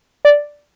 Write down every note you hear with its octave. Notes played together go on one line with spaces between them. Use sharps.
D5